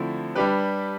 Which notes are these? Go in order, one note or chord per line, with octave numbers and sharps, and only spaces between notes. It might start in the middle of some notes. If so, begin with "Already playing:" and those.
Already playing: D3 F3 A3 C4 E4
G3 D4 G4 B4